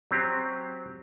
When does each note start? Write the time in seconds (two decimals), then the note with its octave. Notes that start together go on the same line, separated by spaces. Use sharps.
0.11 F#3 C4 G4